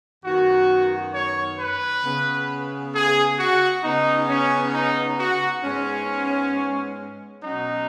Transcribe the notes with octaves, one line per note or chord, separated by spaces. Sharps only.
F#2 D#3 B3 F#4
C#5
B4
C#3 B3
G#4
F#4
C#3 B3 D#4
C#4
D#4
F#4
G#2 G#3 B3 C#4
B2 F#3 C#4 D#4